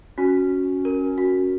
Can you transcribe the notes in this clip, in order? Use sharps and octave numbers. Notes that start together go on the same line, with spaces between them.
C#4 F#4
A#4
F#4